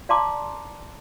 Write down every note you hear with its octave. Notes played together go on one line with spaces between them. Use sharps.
D5 F5 A5 A#5 C6 D6